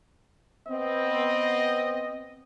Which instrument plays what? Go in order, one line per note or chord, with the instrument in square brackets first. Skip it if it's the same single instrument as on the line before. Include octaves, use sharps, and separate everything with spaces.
[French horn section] B3 C4 [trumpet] D#5